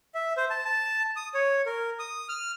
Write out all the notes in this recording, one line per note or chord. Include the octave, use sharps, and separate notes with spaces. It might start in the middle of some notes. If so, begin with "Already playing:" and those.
E5
C5
A5
A5
D#6
C#5
A#4
D#6
F6